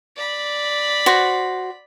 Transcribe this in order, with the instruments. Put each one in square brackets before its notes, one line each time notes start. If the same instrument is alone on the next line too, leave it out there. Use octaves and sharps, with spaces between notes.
[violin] D5 B5
[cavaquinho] F#4 C5